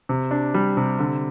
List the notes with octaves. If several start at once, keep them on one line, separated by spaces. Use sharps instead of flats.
C3
D4
G3
C3
D3